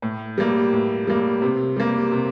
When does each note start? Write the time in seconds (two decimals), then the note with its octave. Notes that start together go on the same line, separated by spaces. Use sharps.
0.02 A2
0.38 G3 A#3
0.73 A2
1.07 G3 A#3
1.42 C3
1.76 G3 A#3
2.12 C3